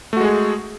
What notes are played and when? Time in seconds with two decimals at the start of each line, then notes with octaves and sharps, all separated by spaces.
0.13 A3
0.17 F#4
0.21 G#3
0.25 G#4